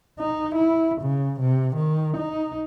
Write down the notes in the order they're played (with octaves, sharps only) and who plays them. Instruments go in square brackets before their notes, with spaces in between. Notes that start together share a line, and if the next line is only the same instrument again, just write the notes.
[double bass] D#4
E4
C#3
C3
D#3
D#4